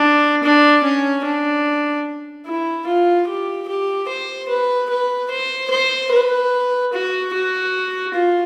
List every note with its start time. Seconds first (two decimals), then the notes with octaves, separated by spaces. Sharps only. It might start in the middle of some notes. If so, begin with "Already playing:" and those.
Already playing: D4
0.43 D4
0.84 C#4
1.25 D4
2.47 E4
2.87 F4
3.28 G4
3.68 G4
4.08 C5
4.48 B4
4.90 B4
5.30 C5
5.70 C5
6.11 B4
6.93 F#4
7.33 F#4
8.14 F4